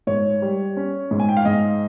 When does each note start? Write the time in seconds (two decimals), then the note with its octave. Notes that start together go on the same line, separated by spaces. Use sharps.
0.07 G#2 C#5
0.42 G3
0.77 C#4
1.11 G#2
1.20 G#5
1.29 G5
1.37 F5
1.45 G#2 D#5